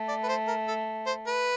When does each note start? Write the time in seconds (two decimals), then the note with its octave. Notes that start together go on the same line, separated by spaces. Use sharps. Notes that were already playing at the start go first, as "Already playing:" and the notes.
Already playing: A3
0.08 D5
0.23 B4
0.29 C5
0.48 A#4
0.68 A4
1.07 C5
1.27 B4